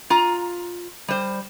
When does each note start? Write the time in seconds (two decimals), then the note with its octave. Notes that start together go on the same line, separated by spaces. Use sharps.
0.10 F4 A#5
1.08 G3 C5